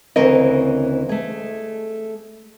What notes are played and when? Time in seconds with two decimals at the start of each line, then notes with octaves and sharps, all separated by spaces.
0.16 D2 C#3 E3 C4 A#4 D#5
1.09 A3 G#4